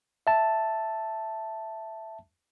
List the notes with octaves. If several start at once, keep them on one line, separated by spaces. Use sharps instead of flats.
E5 A5